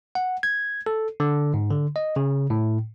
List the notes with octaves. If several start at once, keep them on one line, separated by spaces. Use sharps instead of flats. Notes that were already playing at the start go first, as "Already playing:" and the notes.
F#5
G#6
A4
D3
G#2
D3
D#5
C#3
A2